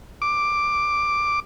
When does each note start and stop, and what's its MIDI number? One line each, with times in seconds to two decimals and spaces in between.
0.22 1.40 86